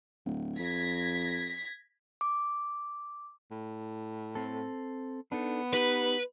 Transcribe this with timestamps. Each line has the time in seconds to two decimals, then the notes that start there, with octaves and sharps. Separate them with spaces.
0.26 D1
0.59 F2 G#6 A#6 B6
2.21 D6
3.51 A2
4.35 C4 A4
5.32 B3 D4 D#4 A4
5.74 D#4 G4 B4